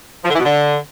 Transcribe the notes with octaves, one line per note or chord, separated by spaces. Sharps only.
F3
D3
E3
B2
D3